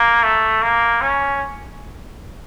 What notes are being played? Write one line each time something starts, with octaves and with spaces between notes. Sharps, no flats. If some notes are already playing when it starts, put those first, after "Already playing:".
Already playing: A#3
A3
A#3
C#4